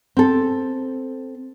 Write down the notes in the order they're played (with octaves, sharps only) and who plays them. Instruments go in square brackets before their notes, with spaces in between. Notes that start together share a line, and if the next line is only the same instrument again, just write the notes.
[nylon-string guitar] C4 A4